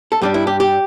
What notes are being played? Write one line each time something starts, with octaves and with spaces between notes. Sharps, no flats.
A4
G2 G3 D4 G4
E4
G4
G4